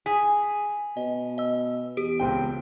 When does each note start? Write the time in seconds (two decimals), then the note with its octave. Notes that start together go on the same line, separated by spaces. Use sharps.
0.06 G#4 B6
0.97 B2 D#5
1.38 D#5 E6
1.97 E2 G4 D7
2.20 C#2 C4 G5